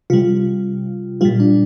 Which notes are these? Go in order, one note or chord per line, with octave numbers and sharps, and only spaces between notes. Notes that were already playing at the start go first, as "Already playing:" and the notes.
C3 G3 F4
A#2 G3 F4
D4